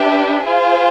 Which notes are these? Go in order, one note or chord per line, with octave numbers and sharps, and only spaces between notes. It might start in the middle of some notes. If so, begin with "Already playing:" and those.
Already playing: D4 G4 B4 E5
F4 G#4 C5